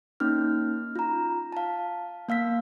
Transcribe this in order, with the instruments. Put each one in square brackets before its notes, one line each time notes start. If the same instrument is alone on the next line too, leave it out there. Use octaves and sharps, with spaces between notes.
[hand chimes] A#3 C#4 D#4 F6
F4 A#5
F5 A5
A#3 F5 E6 B6